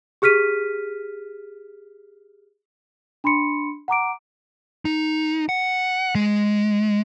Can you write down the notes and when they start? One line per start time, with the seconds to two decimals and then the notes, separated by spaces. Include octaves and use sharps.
0.22 G4 G#4 F6 B6 D#7
3.24 D4 B5 C6 C#7
3.88 F#5 A#5 D6 D7
4.85 D#4
5.49 F#5
6.15 G#3